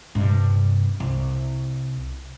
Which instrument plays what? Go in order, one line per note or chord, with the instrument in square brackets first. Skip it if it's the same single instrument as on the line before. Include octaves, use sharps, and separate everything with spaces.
[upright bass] G2 C3
C2